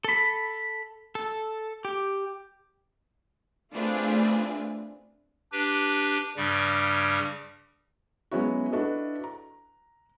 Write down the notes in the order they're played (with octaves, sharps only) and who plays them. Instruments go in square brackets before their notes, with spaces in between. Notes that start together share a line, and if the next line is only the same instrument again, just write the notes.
[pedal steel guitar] A4 B5
A4
G4
[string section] A3 C4 D4 F4 G#4 B4
[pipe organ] D4 G4 B4
G2 C#3 G3
[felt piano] F#3 G#3 B3 C#4 E4 F#4
D4 E4 F#4 A4 B4 D#5
A#5